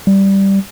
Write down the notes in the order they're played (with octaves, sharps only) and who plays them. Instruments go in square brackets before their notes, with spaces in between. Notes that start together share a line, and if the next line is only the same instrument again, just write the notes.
[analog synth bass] G3